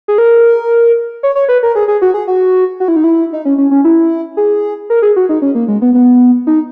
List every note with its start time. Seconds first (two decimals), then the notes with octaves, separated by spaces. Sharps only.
0.08 G#4
0.18 A#4
1.23 C#5
1.35 C#5
1.49 B4
1.63 A#4
1.75 G#4
1.88 G#4
2.02 F#4
2.14 G#4
2.28 F#4
2.80 F#4
2.88 E4
2.96 D#4
3.04 E4
3.33 D#4
3.45 C#4
3.58 C#4
3.71 C#4
3.84 E4
4.37 G#4
4.90 A#4
5.02 G#4
5.16 F#4
5.29 D#4
5.42 C#4
5.55 A#3
5.68 G#3
5.82 B3
5.94 B3
6.47 D#4